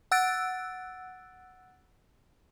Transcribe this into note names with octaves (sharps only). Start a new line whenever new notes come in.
F#5 E6 F#6 A6 D7